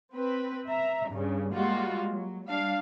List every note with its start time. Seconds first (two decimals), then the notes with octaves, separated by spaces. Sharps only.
0.13 C4 B4
0.67 E5 A#5
1.10 G2 C#3
1.54 G3 G#3 A#3 F4 F#4
2.10 F#3
2.48 G3 D4 F5